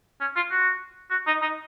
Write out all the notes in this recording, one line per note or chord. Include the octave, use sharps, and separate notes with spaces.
C#4
F4
F#4
F#4
D#4
D#4